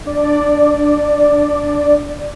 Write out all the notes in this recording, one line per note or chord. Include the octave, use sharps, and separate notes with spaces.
D4 D5